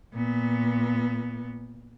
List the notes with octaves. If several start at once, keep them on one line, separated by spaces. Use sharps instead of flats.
A#2 B3